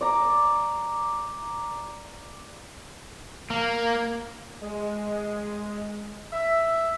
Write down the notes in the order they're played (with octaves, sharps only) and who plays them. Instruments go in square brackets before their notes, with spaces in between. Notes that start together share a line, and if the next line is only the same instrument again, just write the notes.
[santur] D5 A#5
[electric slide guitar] A#3
[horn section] G#3
E5